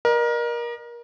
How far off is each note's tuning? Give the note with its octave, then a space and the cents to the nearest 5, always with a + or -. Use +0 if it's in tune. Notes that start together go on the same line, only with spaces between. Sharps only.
A#4 +25 D#5 -45